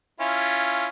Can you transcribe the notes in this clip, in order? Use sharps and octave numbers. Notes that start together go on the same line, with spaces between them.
C#4 E4 F4